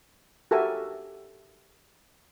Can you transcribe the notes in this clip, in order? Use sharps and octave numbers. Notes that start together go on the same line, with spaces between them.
F#4 G4 A4 A#4 E5 G#5